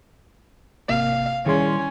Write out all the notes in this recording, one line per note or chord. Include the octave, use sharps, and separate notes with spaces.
G#1 C3 A#3 F5
D#3 G3 C#4 E4 G#4 C6